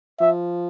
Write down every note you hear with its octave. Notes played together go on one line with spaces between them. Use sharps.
F3 E5